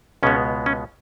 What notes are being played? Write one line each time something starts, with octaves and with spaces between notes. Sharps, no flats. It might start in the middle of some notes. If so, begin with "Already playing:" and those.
C#2 B2 G#3 B3 C#4
C#4